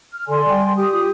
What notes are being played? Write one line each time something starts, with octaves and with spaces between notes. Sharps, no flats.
F6
D3 A4 D5 G#5 C6
G3 G5
G4 D#6
F4